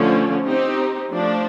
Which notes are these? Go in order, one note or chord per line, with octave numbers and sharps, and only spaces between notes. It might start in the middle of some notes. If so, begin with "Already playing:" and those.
Already playing: D3 F3 A3 C#4
C4 D#4 G4
F3 A3 D4